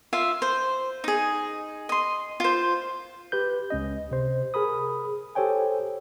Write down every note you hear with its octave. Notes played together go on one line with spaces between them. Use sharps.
F4 E5 F5
C5
D#4 G#4
D#5 C6
F4 C5
G4 B4 G6
C#2 C#4 D#5
C3 C5
G#4 A#4 B5 D#6
G4 A4 C5 C#5 G5 G#5